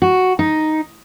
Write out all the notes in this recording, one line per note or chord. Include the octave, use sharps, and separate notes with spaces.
F#4
D#4